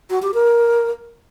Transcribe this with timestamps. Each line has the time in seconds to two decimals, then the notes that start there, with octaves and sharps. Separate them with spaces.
0.10 F#4
0.22 G4
0.34 A#4